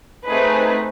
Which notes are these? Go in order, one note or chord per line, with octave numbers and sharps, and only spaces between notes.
A3 C4 D#4 G#4 B4